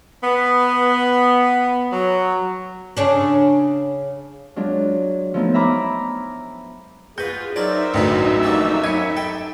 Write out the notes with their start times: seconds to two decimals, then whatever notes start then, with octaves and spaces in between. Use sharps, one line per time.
0.24 B3
1.93 F#3
2.97 C#3 C#4 D4
4.56 F#3 G#3 D4 F4
5.34 F3 F#3 A3 B3 D#4
5.54 E5 G#5 A#5 B5 D6 F6
7.18 F4 F#4 G#4 B4 G6
7.56 F#3 D4 D#4 A#4 C5 D5 E5
7.94 A1 D2 B2 F#3 B3
8.43 F3 G3 A3 A#3 F#4 E6
8.84 F#2 D#5 G#5 B5 G#6 C#7
9.17 A4 G5